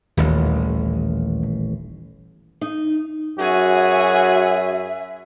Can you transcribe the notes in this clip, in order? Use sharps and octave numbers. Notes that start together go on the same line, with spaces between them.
D#1 A1 D#2
D#4
F#2 F#4 G#4 E5 G#5